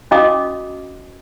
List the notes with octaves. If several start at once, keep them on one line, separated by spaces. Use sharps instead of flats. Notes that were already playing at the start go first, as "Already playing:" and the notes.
C#4 F#4 D#5 F5 D6 D#6